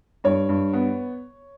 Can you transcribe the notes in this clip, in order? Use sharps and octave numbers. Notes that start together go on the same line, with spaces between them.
G2 C#5
G2
B3